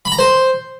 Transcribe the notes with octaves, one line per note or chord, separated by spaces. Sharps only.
B5
A#5
C5